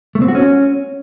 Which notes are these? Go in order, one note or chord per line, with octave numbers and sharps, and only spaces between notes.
A3
C4
F#4
C#4